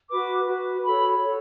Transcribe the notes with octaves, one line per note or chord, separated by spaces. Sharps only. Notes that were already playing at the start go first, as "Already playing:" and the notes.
F#4 B4 D6
F#4 B4
F#4 A4 C#5 B5
F#4 A4 C#5